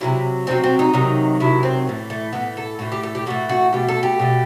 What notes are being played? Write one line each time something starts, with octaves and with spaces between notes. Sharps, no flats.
C3 D#3 F#3 E4
C3 D#3 F#3 C4
C4
D#4
C3 D#3 F#3
C3 D#3 F#3 E4
C4
A2 E3 A3
A3
A2 E3 A3 B3
A4
A2 E3 A3 F#4
G4
A4
G4
A2 E3 A3 F#4
F#4
B2 A3 G4
A4
G4
B2 A3